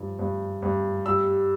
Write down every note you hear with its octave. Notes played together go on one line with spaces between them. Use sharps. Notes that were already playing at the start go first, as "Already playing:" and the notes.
Already playing: G2 F3
G2
G2
G3 E6